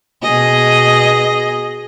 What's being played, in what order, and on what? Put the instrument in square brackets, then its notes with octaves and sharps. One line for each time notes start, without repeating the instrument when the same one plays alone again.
[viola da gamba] B2 G#4 D#5